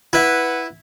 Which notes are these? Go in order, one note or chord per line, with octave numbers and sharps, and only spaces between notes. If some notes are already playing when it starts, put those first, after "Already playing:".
E4 B4 F#5